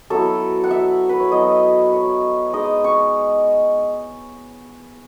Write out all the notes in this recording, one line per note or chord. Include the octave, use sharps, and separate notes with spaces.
F#3 B3 E4 A4
F#5
E5
B4
C#5
F#3 B3 E4 D#5
C#5
G#3 D#4 D#5
C#6